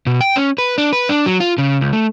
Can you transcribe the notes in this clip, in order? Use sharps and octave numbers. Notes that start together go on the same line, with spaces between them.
B2
G5
C#4
B4
D4
B4
D4
F#3
F4
C#3
C#2
A3